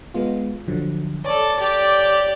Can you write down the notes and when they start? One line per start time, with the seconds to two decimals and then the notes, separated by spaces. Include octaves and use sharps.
0.14 G#3 B3 F4
0.68 D3 F3 F#3
1.25 A4 C#5 D5
1.58 G4 D5